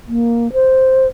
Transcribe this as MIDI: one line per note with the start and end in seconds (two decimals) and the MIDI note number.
0.08 0.52 58
0.53 1.07 72